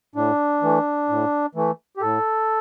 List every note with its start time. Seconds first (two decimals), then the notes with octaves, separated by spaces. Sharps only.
0.15 A2 D4
0.62 E3 A3
1.09 A2
1.55 E3 A3
1.97 G4
2.02 A2 A4